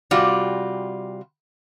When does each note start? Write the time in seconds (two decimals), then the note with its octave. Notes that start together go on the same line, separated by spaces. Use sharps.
0.11 C3 G3 F4 F#4 D5